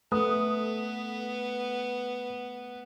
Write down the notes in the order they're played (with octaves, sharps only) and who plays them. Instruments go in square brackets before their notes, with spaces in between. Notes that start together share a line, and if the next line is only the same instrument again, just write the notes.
[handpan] A3 [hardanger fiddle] B3 [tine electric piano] B4 [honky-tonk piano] D#6